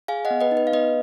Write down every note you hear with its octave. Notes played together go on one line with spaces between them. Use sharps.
G#4 F5 G#5
D#5 F#5
B3
B4 D#5
D#4
B4
F5
B3 B4 D#5